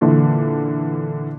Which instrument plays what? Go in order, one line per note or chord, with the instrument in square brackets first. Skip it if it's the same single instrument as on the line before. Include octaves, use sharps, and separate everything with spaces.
[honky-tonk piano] A#2 D3 E3